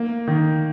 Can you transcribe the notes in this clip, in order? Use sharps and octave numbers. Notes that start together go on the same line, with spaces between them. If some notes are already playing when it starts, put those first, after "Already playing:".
Already playing: A#3
D#3